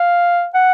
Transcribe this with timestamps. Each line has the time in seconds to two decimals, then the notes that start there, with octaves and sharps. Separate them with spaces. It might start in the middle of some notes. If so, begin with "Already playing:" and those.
Already playing: F5
0.54 F#5